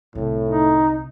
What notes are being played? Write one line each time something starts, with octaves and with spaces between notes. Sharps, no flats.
C2 A2 D3
D#4